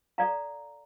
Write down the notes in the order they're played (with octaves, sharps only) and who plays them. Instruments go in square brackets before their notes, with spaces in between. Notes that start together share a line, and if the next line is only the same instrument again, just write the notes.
[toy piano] A4 D5 F5 A#5